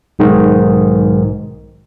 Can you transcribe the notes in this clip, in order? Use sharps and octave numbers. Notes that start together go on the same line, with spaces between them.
B1 G#2 D#3